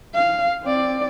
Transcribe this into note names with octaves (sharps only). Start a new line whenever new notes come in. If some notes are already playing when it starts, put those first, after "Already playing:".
F5
C4 D5